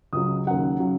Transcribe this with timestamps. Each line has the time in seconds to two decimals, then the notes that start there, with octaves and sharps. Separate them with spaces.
0.13 C#2 C#3 F#3 D#6
0.47 D#2 C#3 F#3 F#5
0.80 C#3 F#3